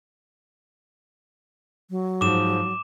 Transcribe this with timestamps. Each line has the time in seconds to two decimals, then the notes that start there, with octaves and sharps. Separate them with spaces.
1.90 F#3
2.21 G#2 F3 D6 E7